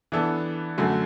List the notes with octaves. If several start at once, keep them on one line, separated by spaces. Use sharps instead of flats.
E3 B3 D4 A4
F#2 D3 A3 F#4